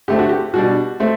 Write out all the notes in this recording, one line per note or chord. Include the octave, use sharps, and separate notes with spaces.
D3 A3 C4 G4
F#4
G4
B2 G3 D4 F#4
A3 C4